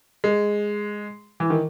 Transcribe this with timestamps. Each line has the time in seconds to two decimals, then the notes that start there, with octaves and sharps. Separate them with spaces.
0.24 G#3
1.40 E3
1.50 D#3